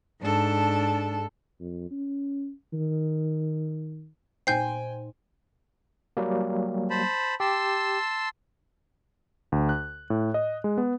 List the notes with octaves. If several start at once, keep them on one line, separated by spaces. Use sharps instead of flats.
G#2 D4 A4
F2
C#4
D#3
A#2 D#4 C5 G5 G#5 G6 C7
F#3 G3 A#3
C5 A5 B5
G4 A5 C6 E6
D2
F#6
A2
D#5
G#3
B3